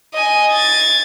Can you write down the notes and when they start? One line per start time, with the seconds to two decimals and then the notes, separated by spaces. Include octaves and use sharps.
0.14 D#5 G#5
0.52 G#6 A6